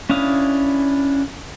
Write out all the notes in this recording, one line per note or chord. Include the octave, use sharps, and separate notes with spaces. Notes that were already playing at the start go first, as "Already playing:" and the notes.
C#4 D4 E4 F5 D#6